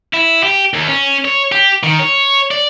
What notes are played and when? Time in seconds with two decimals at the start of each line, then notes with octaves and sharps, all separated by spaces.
0.14 E4
0.43 G4
0.74 D#2
0.88 C#4
1.25 C#5
1.52 G4
1.83 D#3
1.99 C#5
2.51 D5